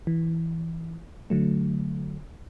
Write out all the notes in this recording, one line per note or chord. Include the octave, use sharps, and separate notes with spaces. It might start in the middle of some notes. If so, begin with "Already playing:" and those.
E3
D3 F#3 A3